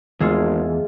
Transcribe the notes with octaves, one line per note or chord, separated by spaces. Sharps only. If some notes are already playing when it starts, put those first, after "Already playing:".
G#1 E2 G#3 A3 F4 G#4